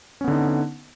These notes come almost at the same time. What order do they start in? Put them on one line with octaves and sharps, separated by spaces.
C#4 B3 D3 D#4